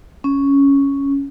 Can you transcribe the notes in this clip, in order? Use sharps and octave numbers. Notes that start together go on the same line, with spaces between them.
C#4